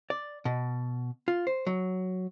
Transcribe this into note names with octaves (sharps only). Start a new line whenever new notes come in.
D5
B2
F4
C5
F#3